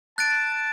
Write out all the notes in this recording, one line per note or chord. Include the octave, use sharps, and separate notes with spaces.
A5 F#6 A6 D7